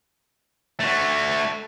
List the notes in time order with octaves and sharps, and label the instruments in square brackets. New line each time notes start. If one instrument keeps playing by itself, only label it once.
[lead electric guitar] A3 F#4